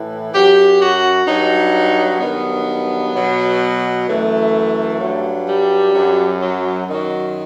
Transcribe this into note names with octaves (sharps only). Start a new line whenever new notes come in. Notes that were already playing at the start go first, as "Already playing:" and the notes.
Already playing: A2 E3
F#2 F#3 G4
F#4
G2 F#3 D#4
G2 D#3 F#3 B3
B2 F#3
F#2 E3 A3
G2 F#3
G3
F#2 F#3
F#3
F#2 D#3 F#3